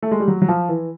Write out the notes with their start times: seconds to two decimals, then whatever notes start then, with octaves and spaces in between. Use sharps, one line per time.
0.02 A3
0.11 G#3
0.20 G3
0.28 F#3
0.42 F#3
0.48 F3
0.69 E3